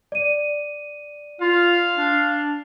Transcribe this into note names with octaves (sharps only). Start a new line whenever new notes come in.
D5 D#7
F4 F5
D4